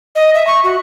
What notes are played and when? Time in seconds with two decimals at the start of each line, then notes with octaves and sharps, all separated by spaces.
0.15 D#5
0.34 E5
0.47 C#6
0.64 F#4